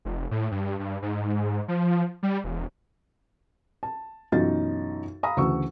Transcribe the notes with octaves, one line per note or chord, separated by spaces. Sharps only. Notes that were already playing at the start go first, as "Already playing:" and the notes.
F1
A2
G2
G2
G#2
F3
G3
E1
A5
B1 F#2 E3 D#4 F4 A6
F5 A#5 B5 D#6
D2 C#3 E3 C#6 E6